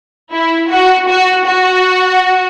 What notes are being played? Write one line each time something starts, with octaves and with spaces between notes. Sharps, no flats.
E4
F#4
F#4
F#4